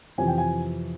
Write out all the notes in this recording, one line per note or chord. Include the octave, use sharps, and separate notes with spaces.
F2 C3 E3 G#5
G5
G#5